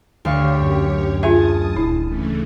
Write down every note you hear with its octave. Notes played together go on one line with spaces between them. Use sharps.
D2 G4 C#5 F5 C#6
F#2
F4 G#4 E5 G#5 A5 D#6
D#1 E4
C#3 E3 A3